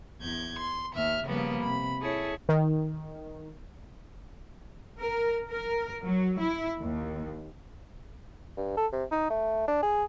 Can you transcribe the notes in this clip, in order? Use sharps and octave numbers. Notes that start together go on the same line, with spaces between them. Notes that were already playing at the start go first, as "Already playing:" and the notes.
E2 G6 G#6
C6
D#2 E5 F6
C#3 F3 G3 A#3 B3 B4
C3 B5
E4 G#4 A4 C#5
D#3
A#4
A#4
F#3
E4
D#2
G2
A4
C3
D#4
A3
D4
G#4